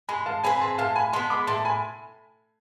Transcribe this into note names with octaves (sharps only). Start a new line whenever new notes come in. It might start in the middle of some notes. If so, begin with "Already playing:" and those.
G#3 G#5 B5
F5 A5
C4 G#4 B4 G#5 B5
A5 C6
A2 F5 A5
G#5 B5
G#3 B3 A5 C6
B5 D6
A2 A5 C6
G#5 B5